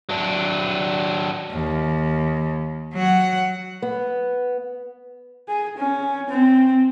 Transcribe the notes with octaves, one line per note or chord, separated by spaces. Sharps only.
F#3 D4
D#2
F#3 F#5
B3
G#4
C#4
C4